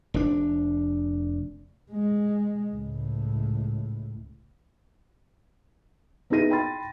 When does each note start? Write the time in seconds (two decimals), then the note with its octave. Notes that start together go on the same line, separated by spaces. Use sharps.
0.14 F1 D4
1.91 G#3
2.71 C#2 A2
6.30 B3 D#4 E4 G#4 A#6 D#7
6.50 G5 B5 C6 A6